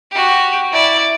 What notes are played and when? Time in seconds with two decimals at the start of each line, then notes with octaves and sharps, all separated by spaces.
0.11 F#4 G4
0.72 E4 D5